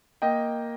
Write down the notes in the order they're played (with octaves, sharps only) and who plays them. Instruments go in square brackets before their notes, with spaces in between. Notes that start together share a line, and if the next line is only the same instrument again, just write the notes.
[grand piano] A#3 D#5 G5